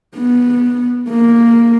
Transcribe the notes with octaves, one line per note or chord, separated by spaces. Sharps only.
B3
A#3